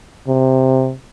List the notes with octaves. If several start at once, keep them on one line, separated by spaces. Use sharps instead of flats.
C3